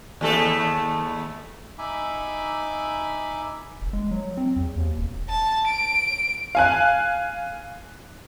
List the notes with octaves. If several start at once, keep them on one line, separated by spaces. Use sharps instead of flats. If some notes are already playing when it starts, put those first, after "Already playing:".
D#2 A3 A4
D#4 E5 G#5 B5 D6
F1
G#3
F#3
C4
E2
D#2
E1
A5
D7
F5 G#5 F#6